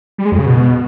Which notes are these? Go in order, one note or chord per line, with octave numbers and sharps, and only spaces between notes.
G3
G#3
F2
C#3
B2